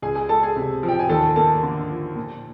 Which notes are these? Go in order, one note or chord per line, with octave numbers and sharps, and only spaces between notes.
C#2 G#4 G#5
G#4 G#5
G#3 A4 A5
G#4 G#5
C3
F3
G5
G#5
D#2 A4 A5
A#3 A4 A5
D3
F3
A#2